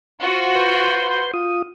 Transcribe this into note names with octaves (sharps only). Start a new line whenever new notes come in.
F4 F#4 C5
B4 C6 G6
F4 D#6